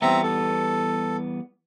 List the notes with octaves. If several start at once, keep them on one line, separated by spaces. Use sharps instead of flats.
E3 G3 B3 C4 E5 A#5
A4